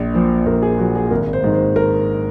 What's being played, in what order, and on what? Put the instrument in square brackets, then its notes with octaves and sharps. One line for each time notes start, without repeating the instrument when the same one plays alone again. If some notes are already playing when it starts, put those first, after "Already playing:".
Already playing: [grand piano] A#1
A#2 F3 C5
A#1 A#4
G#4
A#2 F3 F#4
G#4
G#1 A#4
C5
G#2 D#3
C5
A#4